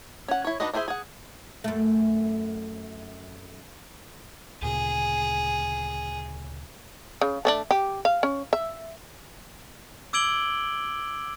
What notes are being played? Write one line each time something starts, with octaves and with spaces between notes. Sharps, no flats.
C#4 F#5
E4 C#5
D4 D#4 F#4 B4 D#5
D4 E4 G#4 C5 E5
G#4 F#5
F#2 A3
D2 A#2 C#3 G#4
C#3
A3 C#4 D4
G4
F5
C#4
E5
D6 E6 G#6 D7 F#7 G7